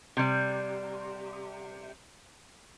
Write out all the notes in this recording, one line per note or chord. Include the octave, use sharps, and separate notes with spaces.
C3 G3